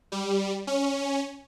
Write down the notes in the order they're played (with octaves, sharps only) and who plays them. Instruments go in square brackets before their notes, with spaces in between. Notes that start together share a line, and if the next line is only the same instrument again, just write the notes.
[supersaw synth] G3
C#4